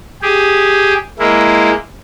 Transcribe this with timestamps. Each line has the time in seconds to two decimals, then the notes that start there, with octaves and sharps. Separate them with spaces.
0.22 G4 G#4
1.19 G#3 A#3 E4